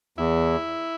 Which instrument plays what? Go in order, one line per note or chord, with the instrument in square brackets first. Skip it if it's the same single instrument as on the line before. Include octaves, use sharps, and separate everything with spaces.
[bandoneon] E2 [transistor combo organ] E4